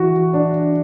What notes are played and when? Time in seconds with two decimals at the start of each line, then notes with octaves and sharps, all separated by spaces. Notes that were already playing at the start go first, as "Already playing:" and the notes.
Already playing: E3 F#4
0.34 D4